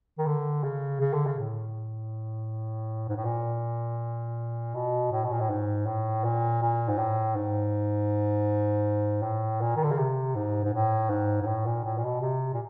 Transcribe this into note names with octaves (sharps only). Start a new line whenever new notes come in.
D#3
D3
C#3
C#3
D3
C#3
A2
G#2
A2
A#2
B2
A2
B2
A#2
A2
G#2
A2
A#2
A#2
G#2
A2
G#2
A2
A#2
D#3
D3
C#3
C3
G#2
G#2
A2
G#2
G#2
A2
A#2
A2
A#2
B2
C3
A#2